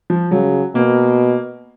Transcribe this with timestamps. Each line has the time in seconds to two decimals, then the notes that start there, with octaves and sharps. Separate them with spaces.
0.10 F3
0.31 C#3 F#3
0.75 B2 A#3